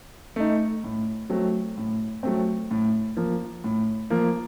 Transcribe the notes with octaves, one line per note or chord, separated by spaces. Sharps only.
A3 D#4
A2
F#3 A3 C4
A2
F#3 A3 C4
A2
F3 A#3
A2
F3 A#3